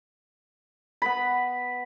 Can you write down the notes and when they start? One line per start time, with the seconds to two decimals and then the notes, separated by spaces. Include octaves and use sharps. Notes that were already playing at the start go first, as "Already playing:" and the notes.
1.02 B3 B4 B5